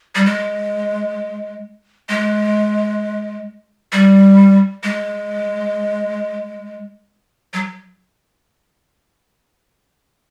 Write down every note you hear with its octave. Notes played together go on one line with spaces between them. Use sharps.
G3
G#3
G#3
G3
G#3
F#3